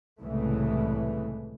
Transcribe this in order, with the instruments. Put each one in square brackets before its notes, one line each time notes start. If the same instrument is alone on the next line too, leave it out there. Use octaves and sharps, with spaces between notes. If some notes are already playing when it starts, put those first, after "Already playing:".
[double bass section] C2 A2 C#3 E3 G#3 A3